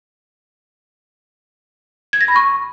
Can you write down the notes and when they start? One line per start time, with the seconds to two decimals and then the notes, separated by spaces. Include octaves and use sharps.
2.13 G#6
2.21 A#6
2.28 B5
2.36 C#6